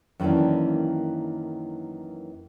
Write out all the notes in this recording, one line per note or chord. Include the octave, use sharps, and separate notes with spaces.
F#2 D#3 E3 A#3 D4